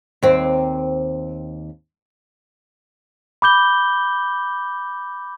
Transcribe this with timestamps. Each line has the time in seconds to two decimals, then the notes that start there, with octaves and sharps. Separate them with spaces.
0.22 D#2 C4
3.42 B5 D6 G6 G7